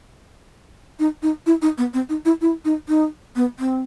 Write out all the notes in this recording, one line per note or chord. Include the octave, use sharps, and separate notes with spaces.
D#4
D#4
E4
D#4
B3
C4
D#4
E4
E4
D#4
D#4
B3
C4